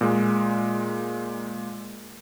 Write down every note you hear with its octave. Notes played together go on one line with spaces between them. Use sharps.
A#2 G#3